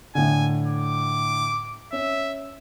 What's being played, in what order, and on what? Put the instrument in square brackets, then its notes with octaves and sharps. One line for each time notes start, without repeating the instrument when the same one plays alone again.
[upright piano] A2 D3 [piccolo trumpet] G#5
[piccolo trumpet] D6
[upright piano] C#4 [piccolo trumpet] E5